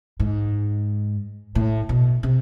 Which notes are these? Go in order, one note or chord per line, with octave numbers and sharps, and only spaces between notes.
G#2
A2
B2
C3